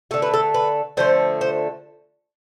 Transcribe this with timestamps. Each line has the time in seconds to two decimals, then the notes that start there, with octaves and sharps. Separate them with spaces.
0.11 D3 A3 A4
0.22 B4
0.34 A4
0.54 B4
0.97 D3 F3 A3 C5
1.41 C5